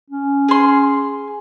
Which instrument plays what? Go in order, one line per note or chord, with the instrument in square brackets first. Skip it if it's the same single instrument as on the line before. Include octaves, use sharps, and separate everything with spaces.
[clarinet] C#4
[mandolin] G#4 C6